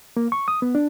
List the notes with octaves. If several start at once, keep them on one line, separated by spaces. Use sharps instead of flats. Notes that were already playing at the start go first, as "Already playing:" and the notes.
A#3
C#6
D#6
B3
D4